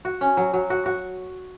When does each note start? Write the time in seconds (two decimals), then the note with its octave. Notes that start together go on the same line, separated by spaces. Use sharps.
0.05 F#4
0.21 C#4
0.37 F#3
0.54 F#3
0.70 F#4
0.86 F#4